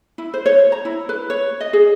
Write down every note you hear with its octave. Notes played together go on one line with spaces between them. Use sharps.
E4
C5
C#5
A#5
E4
B4
C#5
D#5
G#4